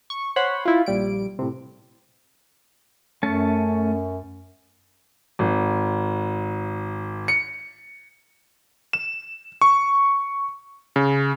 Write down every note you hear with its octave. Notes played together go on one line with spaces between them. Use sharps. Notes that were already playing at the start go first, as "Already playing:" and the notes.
C#6
C5 C#5 F#5 B5 C6
E4 F4
A#1 G3 D7
A2 C3
F#2 A3 C#4 A5
G#1
C#7
E7
C#6
C#3